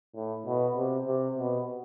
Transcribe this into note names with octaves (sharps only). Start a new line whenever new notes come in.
A2
B2
C3
C3
B2